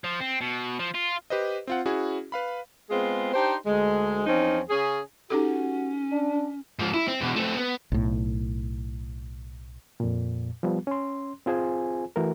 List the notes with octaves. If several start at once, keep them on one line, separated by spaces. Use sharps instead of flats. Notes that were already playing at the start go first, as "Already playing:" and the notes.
F3
C4
B2
F3
F4
G4 B4 C5 D#5
C4 F4 F#5
C#4 E4 F#4 G#4
B4 F5 B5
G#3 B3 C4 F4 G#4
D4 D#4 G4 C5
D2 G#3
E2 F3 C4 C#4 D#4
C#3 C#4 G#4
C#4 D#4 F#4 G4 A4
D4
G#2 F3
E4
C4
E2 B2
A3 C4
B3
B1 A2
F2 A#2
F3 G3 B3
C#4 C6
C4 F4 G#4 C5 G#5
E3 A3 F#4 A#4